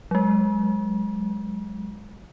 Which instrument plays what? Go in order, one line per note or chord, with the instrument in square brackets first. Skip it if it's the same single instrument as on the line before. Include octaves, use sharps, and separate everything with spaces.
[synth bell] F#3 G#3